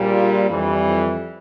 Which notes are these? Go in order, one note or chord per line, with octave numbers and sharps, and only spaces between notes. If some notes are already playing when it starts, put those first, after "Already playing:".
Already playing: A#1 A#2 G3
F4
F2 E3 G3 D4